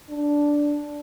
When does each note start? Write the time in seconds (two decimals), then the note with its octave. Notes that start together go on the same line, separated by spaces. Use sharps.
0.10 D4